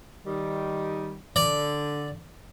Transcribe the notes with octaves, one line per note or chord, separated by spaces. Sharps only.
D#3 G3
D3 D5